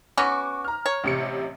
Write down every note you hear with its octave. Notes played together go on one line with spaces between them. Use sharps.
B3 C#4 F#4 C#6 D6
A#5 F6
C#5
A1 C3 C#7